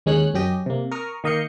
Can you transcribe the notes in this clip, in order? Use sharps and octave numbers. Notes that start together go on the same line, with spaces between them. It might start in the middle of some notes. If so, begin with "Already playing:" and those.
D#2 G#3 C#4 D#4 C#5 F#6
F#2 C#4 G4 D#5
C3 A#3
A#4 C#6 D#6 F6
D#3 A#3 D#5 F5 G6 C#7